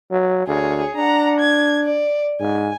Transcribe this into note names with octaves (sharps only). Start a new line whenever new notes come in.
F#3
D2 G#4 C#5
D4 F#5 A#5
G#6
D5
G#2 G#5